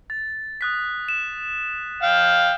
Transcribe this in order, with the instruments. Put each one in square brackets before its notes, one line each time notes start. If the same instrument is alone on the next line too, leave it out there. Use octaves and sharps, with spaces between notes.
[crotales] A6
D#6 F#6 B6
E7
[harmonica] F5 G5